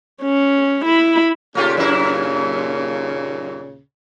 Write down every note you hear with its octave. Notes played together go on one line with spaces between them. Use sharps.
C#4
E4 B5
D#2 A#2 C#3 A3 F4 G4
F#2 A#3 E4